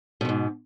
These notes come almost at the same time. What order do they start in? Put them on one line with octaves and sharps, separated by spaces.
B2 F2 G#2